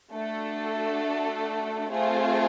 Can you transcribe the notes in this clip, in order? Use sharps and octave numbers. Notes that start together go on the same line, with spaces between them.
A3 D4 F#4 A4
A3 C4 F4 G#4